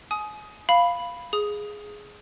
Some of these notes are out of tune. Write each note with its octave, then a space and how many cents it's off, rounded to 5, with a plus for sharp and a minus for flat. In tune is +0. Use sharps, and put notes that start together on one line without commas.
G#5 +30 D#6 +10
F5 +0 B5 +0
G#4 +0 D#6 +10